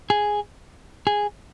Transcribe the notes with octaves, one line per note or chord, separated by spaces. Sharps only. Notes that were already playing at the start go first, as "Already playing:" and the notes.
G#4
G#4